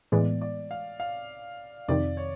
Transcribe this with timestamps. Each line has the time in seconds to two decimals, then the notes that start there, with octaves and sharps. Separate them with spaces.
0.12 A2 E3 G#3 B3 D5
0.41 D5
0.71 F5
1.00 F5
1.88 F2 C3 D#3 D5
2.17 C#5